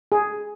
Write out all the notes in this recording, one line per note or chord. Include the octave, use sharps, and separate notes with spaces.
G#4